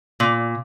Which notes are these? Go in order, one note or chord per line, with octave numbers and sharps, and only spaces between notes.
A#2